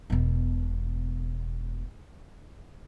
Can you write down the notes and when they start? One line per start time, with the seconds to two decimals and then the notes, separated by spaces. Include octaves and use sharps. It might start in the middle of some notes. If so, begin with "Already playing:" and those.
0.10 E1 B2